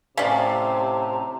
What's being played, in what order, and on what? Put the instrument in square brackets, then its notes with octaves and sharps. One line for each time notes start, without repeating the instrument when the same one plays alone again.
[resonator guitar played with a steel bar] A2 F5 [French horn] C3 [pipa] C#4 D5 [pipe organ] G4 A5 A#5